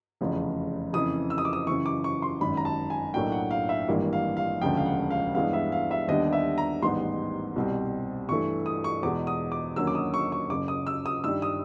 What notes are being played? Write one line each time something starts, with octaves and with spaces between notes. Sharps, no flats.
F1 E2 C#3 F3
F2 C#3 E3 D#6
E6
D#6
D6
D#6
F#2 C#3 E3 C#6
D6
C#6
C6
G#1 F#2 D#3 B5
A#5
A5
G#5
B1 A2 F#3 A#3 D4 G5
F#5
F5
E5
G#1 G2 E3 G3 A#3
F5
F5
E1 D2 C#3 F3 G5
F5
F#5
F5
G2 E3 G#3 B3 F5
E5
F5
E5
D#2 D3 G3 B3 D4 D#5
E5
A#5
A1 G#2 D#3 G3 B3 C6
C2 B2 G3 C4
G2 E3 A3 C#6
D#6
C#6
E2 B2 G#3 D6
D#6
D6
D#2 D3 F#3 A#3 C#4 E6
D6
D#6
C#6
C#6
F#1 F#2 C#3 D6
D#6
E6
D#6
G2 D#3 G3 E6
D#6